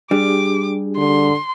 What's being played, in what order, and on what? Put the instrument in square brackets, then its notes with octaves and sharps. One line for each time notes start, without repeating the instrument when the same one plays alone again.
[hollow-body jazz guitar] G3 [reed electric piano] D4 G4 G#4 [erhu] D6
[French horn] D3 [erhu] C6